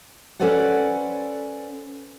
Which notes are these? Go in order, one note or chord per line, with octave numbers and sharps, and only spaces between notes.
C#4 A4 B4 C5 D5 F#5